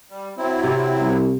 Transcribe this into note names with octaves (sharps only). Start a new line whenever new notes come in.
G3
F#3 C4 E4
C3
C2